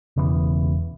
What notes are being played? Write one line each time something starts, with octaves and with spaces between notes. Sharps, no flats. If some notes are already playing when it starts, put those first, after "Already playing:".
E1 C#3 E3 B3